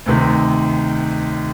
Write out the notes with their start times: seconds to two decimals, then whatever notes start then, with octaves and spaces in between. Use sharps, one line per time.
0.06 D2 C3 D#3